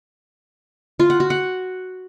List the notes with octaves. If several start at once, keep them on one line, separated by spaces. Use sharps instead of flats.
F4
F#5
F#4
F#5